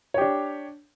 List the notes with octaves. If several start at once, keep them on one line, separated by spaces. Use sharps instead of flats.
D4 G4 C#5